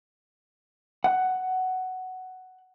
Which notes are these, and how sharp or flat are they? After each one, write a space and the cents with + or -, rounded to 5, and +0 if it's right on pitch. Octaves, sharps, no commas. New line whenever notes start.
F#5 +10